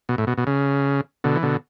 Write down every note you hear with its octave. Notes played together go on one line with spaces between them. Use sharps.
B2
A2
B2
B2
C#3
B2 D3
E3
B2 D3